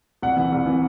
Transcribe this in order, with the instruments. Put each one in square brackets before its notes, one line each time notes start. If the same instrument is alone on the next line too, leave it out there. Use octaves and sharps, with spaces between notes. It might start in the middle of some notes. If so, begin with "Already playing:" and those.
[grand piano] C2 F#5
C3 E3
C2
C3 E3